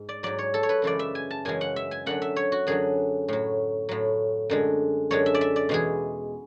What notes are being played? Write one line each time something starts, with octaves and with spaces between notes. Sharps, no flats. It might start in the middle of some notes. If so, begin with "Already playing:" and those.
Already playing: G#2
D5
G#2 F#3 D5
C#5
A4
C#5
B4
F#2 C#3 E3 G#3 D5
E5
G#5
A5
F#2 C#3 E3 G#3 G#5
F#5
E5
G#5
F#2 D3 F#3 F#5
E5
C#5
F#4
F#2 D3 F#3 G#4
A2 F#3
A2 F#3
F#2 D3 G#3
F#2 D3 G#3 C#5
E5
D5
E5
D5
E2 B2 G#3 G#4